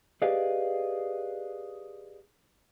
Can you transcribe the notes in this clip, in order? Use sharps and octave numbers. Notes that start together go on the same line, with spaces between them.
G4 G#4 B4 D5 D#5 F5